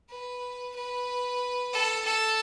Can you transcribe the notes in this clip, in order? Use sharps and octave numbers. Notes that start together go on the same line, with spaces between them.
B4
B4
A4
A4